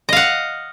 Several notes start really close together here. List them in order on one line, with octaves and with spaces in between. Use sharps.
D#5 F5 F#5